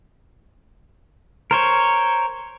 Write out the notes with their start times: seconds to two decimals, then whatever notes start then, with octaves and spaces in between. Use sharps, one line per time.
1.51 A#4 C5 C#5